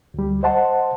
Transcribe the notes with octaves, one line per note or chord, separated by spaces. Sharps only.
D2 G3
C5 D#5 F#5 A5 C6